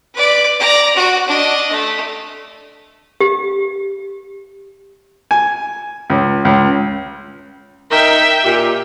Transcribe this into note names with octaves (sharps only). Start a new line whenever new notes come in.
B4 D5
D5 A#5
F#4
D4 D#5
A3
G4
G#5
C#2
C#2
D#4 A#4 E5 G5
A#2 G4